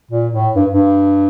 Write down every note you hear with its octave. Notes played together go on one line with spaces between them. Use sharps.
A#2
A2
G2
G2